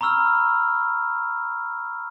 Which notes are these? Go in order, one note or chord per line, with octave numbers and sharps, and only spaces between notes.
A#5 B5 C#6 E6 F6